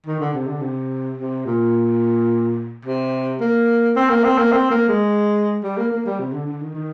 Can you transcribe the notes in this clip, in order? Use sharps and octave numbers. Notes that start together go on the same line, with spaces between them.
D#3
D3
C3
D3
C3
C3
A#2
C3
A#3
C4
A#3
C4
A#3
C4
A#3
G#3
G3
A#3
A#3
G3
C3
D3
D3
D#3
D#3